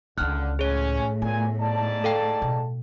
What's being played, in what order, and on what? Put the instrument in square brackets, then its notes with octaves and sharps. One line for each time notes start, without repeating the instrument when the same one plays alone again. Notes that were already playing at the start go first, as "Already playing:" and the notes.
[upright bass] C#2 D#4 [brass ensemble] D3 [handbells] F6 F#6
[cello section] A2 [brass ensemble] C#4 [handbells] G#4 C#5
[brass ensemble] A#2 G#5 [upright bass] B3
[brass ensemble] G#2 D5 A5
[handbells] A4 F5 G5
[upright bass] B2